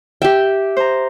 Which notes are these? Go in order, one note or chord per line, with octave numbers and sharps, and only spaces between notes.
G4 E5 G5
C5 A#5